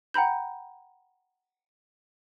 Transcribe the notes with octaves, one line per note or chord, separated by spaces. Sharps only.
F#5 G5 A#5 B5 G6